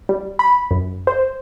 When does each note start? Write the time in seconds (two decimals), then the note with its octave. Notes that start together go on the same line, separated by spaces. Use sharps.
0.09 G3
0.39 B5
0.71 F#2
1.07 C5